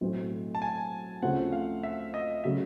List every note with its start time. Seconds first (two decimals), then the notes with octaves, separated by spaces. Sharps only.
0.01 B1 A2 F#3 A3 C4
0.55 A5
0.62 G#5
1.22 D2 C#3 F3 A3 C4 F#5
1.52 F5
1.83 E5
2.14 D#5
2.44 C#3 F#3 A3 E5